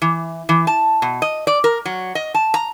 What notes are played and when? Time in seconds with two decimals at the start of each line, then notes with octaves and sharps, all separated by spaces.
0.02 E3
0.49 E3
0.67 A5
1.02 B2
1.22 D#5
1.47 D5
1.64 A#4
1.85 F#3
2.15 D#5
2.34 A5
2.54 A#5